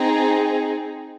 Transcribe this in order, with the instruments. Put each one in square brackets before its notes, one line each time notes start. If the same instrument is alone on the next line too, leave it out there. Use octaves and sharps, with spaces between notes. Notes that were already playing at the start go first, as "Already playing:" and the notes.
Already playing: [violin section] C4 D#4 G#4